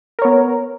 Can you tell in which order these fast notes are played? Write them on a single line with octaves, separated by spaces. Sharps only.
A#4 C#5 B3